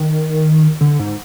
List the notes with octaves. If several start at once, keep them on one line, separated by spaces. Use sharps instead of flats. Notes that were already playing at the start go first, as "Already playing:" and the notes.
Already playing: D#3
D3
G#2